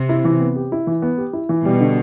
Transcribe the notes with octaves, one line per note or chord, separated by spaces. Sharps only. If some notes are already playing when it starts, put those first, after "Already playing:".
Already playing: C3
E4
E3
B3
G4
E4
E3
B3
G4
E4
E3
B2 G3
D3